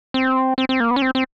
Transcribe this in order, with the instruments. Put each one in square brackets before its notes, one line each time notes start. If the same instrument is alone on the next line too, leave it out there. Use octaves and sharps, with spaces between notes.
[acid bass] C4
C4
C4
A#3
B3
C#4
C4
C4